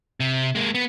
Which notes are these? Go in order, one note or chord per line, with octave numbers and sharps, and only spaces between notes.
C3
G#3 A#3
B3